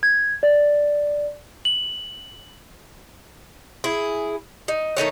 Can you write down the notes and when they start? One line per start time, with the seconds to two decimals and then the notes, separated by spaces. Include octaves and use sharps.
0.03 G#6
0.43 D5
1.65 F#7
3.84 E4 G#4
4.68 D#4
4.97 D#3 A3 D#4 C#5